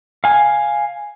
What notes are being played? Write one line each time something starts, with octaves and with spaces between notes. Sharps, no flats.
F5 G#5